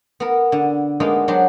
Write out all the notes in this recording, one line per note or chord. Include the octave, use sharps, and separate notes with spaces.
B3 A#4
D3
G#3 A#3 B3 D4 D#4 F4
F#3 B3 D4 G4 C5 C#5